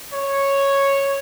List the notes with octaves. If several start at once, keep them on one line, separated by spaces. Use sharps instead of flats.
C#5